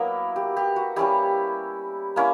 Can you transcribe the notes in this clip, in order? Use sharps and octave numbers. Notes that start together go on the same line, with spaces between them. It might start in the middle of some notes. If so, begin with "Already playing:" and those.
Already playing: F#3 A#3 B3 E4 A#4
G4
G4
F#4
G3 C#4 E4 G4
A#3 C#4 E4